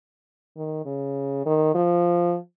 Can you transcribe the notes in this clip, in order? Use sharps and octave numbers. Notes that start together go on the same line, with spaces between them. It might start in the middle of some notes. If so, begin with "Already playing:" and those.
D#3
C#3
D#3
F3